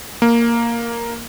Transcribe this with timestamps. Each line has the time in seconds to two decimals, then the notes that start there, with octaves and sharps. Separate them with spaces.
0.22 A#3